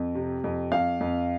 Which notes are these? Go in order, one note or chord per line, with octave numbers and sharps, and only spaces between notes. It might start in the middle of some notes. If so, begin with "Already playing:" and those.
Already playing: F2
C3
F2
F2 F5
F2